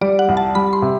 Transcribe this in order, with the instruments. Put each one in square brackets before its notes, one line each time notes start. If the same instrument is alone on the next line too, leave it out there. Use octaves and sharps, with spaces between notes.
[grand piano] G3 [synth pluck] D5
[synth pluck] F#5
[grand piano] C2
[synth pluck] A5
[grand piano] G3 [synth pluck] B5
[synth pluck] C6
[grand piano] C3